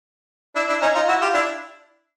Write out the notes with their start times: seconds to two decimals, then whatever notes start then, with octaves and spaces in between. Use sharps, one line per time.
0.55 D4 E4
0.69 D4 E4
0.82 C#4 D#4
0.95 D#4 F4
1.08 E4 F#4
1.21 F4 G4
1.34 D4 E4